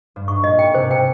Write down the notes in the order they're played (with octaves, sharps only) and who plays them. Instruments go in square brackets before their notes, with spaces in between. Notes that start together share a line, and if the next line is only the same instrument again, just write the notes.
[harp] G2
[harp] G#2 [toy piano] C#6
[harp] A#2 [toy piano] D#5
[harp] G#2 [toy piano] G5
[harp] C3 [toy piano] C5
[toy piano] G5